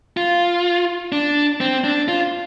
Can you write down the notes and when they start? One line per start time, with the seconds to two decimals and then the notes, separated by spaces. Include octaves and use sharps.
0.17 F4
1.12 D4
1.61 C4
1.84 D4
2.08 F4